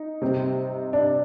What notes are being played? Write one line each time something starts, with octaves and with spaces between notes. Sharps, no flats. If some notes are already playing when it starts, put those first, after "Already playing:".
Already playing: D#4
C3 G3 C4
D4